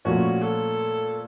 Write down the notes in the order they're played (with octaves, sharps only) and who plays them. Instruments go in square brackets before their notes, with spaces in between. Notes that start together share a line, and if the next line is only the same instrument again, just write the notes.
[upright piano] A#2 F3 A3 C#4 [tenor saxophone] F#4
[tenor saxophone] A4